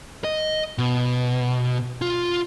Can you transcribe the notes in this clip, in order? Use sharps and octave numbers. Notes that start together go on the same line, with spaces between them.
D#5
B2
F4